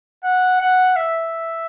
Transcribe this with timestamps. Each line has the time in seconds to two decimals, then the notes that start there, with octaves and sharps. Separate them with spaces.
0.24 F#5
0.60 F#5
0.96 E5